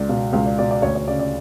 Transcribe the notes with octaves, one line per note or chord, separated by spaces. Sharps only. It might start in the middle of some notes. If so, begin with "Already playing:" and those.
Already playing: C#2 D5
B2 F5
C#2 F5
D5
B2 D5
D5
D2 C#5
C#5
C#3 D5
D5